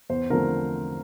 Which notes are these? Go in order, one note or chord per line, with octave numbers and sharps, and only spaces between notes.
E2 C5
D3 F3 A3 C4 A#4